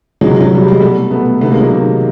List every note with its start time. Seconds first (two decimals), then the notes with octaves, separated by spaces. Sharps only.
0.21 C3 E3 F#3 G#3
0.41 F#3
0.52 C3 E3 G3
0.68 G#3
0.81 B2 G3 A3
1.11 B2 A3 B3
1.41 C3 D#3 A3 B3
1.51 G#3 A#3
1.61 F#3
1.72 C3 D#3